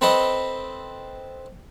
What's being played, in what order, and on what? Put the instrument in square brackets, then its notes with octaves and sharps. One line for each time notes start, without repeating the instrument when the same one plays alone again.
[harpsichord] C4 A4 B4 D#5 C6